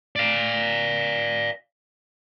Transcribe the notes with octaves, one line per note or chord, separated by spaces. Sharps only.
D5 F5